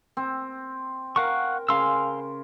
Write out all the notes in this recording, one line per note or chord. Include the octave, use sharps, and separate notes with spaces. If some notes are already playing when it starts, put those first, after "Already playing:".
C4
A#4 F5 F#5 C#6
C#3 C5 F5 C6 E6